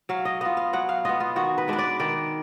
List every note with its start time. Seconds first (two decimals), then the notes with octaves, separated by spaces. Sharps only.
0.09 F#3 F5
0.25 D#5
0.41 B3 F4 D#5
0.57 F5
0.73 F#3 F#5
0.89 F5
1.05 B3 F4 D#5
1.20 F4
1.36 D#3 F#4
1.58 B4
1.68 G#3 D4 B4
1.78 D5
2.00 D#3 D5